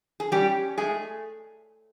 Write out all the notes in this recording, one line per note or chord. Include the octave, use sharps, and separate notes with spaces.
G#4
G3 C#4 G4
G#3 A3 G#4